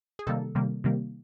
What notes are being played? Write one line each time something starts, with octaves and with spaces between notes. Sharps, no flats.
G#4
C3 D#3 G3 A#3 A4
C3 D#3 G3 A#3
C3 D#3 G3 A#3